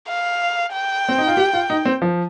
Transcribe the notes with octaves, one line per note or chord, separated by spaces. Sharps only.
F5
G5
C4
D#4
F4
G4
F4
D#4
C4
F3